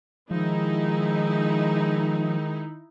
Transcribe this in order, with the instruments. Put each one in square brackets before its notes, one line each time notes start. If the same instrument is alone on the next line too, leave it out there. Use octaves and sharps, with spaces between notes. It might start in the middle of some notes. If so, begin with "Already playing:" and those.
[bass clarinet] D#3 [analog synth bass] F3 [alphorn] G#3 [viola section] D#4 E4